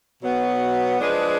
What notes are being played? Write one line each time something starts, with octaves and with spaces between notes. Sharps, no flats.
B2 F#3 B3
F3 G#3 D4 G#4 B4